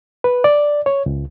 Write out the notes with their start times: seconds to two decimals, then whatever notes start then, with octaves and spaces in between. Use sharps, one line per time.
0.24 B4
0.44 D5
0.86 C#5
1.06 C#2